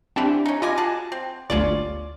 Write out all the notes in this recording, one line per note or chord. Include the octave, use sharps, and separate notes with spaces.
D3 E3 C4 D4 G4
C#4 D#4
F4 B4 D#5 G#5 D6 A#6
F#4 G#4 A5
C4
G1 D2 C#4 F4 D5